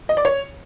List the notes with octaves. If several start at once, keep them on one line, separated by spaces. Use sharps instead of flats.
D#5
D5
C#5